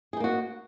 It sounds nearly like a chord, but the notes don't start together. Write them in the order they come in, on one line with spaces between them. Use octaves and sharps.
G#4 D#4 A#3 F#4